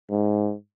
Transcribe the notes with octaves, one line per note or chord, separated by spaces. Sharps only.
G#2